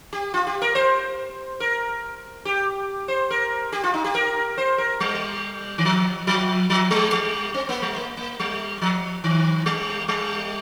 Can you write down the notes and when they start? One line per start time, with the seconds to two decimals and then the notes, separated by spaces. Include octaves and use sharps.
0.13 G4
0.34 F4
0.47 G4
0.62 A#4
0.75 C5
1.60 A#4
2.45 G4
3.08 C5
3.31 A#4
3.72 G4
3.83 F4
3.94 D#4
4.04 G4
4.15 A#4
4.58 C5
4.78 A#4
5.00 G3
5.78 D#3
5.85 F3
6.27 F3
6.70 F3
6.91 G3
7.12 G3
7.54 C4
7.69 A#3
7.82 G3
7.96 A#3
8.17 A#3
8.40 G3
8.81 F3
9.24 D#3
9.66 G3
10.08 G3